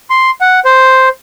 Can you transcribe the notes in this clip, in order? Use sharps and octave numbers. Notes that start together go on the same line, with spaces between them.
C6
F#5
C5